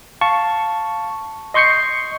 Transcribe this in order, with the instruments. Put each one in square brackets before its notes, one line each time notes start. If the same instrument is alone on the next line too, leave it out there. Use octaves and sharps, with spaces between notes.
[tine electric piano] F5 A5 C#6
D#5 C6 C#6 G6 C7 C#7